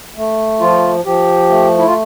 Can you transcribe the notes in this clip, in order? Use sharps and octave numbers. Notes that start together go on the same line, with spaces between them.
A3
F3 F4
F3 G4
A3
E4
F4